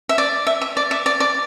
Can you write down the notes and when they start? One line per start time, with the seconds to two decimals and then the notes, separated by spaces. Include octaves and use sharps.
0.09 E5
0.18 D5
0.47 E5
0.61 E5
0.77 D5
0.91 E5
1.06 D5
1.20 D5